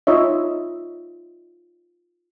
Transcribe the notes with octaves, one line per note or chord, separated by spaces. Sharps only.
D#4 F4 C#5 D#5 E5